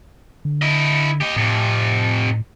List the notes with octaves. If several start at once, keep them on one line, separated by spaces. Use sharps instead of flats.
D3
E4 D#5
G4 D#5
F2 A2 C3